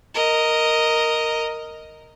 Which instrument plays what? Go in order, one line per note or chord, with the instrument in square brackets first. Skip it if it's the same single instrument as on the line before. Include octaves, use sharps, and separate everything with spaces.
[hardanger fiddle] A#4 D#5